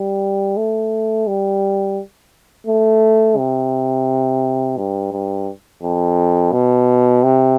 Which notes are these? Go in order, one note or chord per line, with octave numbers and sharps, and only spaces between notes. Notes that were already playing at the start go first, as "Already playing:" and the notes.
Already playing: G3
A3
G3
A3
C3
G2
G2
F2
B2
C3